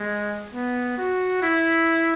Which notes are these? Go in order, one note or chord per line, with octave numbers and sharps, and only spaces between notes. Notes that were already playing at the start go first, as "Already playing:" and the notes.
Already playing: G#3
B3
F#4
E4